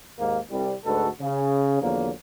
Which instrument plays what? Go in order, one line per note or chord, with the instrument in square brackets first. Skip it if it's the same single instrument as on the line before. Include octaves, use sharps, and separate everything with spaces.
[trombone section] D#2 G#2 A#3
C2 G3
D2 G#2 G#3 F#4 A4 B4
C#3
E2 D3 F3 F#3 A#3